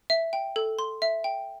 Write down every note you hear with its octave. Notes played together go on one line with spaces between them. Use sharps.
E5
G5
A4
C6
E5
G5